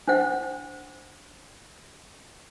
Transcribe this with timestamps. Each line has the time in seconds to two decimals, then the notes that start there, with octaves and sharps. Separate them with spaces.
0.08 D4 C5 F#5